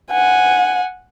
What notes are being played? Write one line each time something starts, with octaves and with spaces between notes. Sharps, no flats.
F#5 G#5